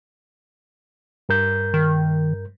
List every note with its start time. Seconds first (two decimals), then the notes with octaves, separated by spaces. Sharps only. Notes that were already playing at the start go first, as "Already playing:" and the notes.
1.29 G2 A#4 G6
1.74 D#3